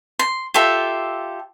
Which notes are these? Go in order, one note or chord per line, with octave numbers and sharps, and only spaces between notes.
C6
F4 G4 A4 E5